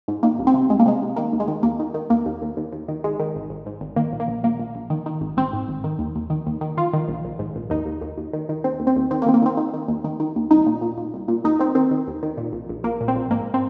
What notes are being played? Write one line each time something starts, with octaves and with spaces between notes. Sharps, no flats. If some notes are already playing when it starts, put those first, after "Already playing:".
G#2
D#3 A#3
C2
C4
C3
C2 G#3
A#3
C3 G#3
C2
D#3 A#3
D#2
G#3
D#3
D#2 A#3
D#3
D#3
D#2 A#3
D#2
D#2
D#2
D#2
D#3
G#1 G#3
D#3
G#1
G#1
G#2
G#1
D#3 A#3
A#1
A#3
A#1
A#1 A#3
A#1
A#1
D#3
D#3
G#1
G#1 C4
G#2
G#1
D#3
D#2
D#2
D#3
D#2
D#3
D#3 F4
D#3
A#1
A#1
G#2
A#1
D#2 D#4
D#2
D#2
D#2
D#3
D#3
D#2 C4
D#2
C4
D#2
D#3 C4
A#3
D#3 C4
A#3
D#3 C4
D#3
D#3
D#2
D#3
D#3
D#2
C2 D#4
A#2
A#2
A#2
C2
A#2
D#2 D#4
D#3 C4
D#3 C4
D#3
D#2
D#3
A#2
A#1
A#1
A#1 A#3
A#2
C4
A#1
G#2 A#3
C4